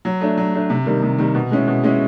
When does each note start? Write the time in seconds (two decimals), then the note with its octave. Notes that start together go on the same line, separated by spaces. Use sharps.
0.05 F#3
0.21 A3 D4
0.37 F#3
0.54 A3 D4
0.70 C3
0.86 D#3 G3 A#3
1.03 C3
1.19 D#3 G3 A#3
1.35 B2
1.51 G#3 C#4 E4
1.68 B2
1.84 G#3 C#4 E4